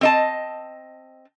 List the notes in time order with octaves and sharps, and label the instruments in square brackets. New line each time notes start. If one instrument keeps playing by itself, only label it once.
[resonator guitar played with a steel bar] C4 D#5 A5